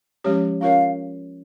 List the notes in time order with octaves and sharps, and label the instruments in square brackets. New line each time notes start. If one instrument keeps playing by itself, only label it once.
[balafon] F3 G#3 C#4 G4 C#5
[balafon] C#4 F4 A#4 C#5 [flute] F5